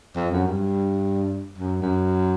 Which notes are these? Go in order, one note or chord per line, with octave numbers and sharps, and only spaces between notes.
F2
F#2
G2
F#2
F#2